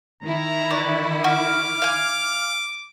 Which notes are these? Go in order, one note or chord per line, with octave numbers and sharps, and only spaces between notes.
D#3 E4 A#5
B4 D5 C#6
F#4 D6 F6
F5 G#5